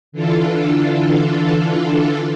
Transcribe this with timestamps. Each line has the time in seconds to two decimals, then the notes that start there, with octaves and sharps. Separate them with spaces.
0.12 D3 E3 D4 F4 A4